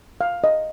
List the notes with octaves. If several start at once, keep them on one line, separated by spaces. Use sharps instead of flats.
F5
D#5